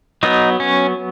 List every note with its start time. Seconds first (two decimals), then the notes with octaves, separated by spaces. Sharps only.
0.23 F#3 B3 D#4
0.60 C#4